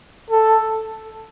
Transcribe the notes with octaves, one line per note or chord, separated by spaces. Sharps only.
A4